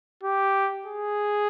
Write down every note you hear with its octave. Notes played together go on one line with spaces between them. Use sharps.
G4
G#4